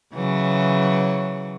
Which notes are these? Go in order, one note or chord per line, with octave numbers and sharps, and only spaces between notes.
C#3 E3 F#3